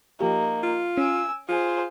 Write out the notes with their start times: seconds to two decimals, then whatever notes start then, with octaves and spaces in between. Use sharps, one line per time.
0.21 F3 A#3 D#4 G4
0.63 F4
0.97 C#4 G#5 E6 D7
1.49 F4 G#4 C5